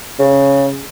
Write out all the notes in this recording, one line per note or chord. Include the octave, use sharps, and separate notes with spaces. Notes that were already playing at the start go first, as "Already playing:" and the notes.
C#3